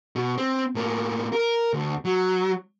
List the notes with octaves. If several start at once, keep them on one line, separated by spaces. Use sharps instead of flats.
B2
C4
A2 A#3
A#4
D2
F#3